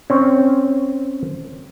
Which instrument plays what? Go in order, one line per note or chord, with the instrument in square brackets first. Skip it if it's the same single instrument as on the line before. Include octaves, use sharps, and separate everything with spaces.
[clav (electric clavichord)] C4 C#4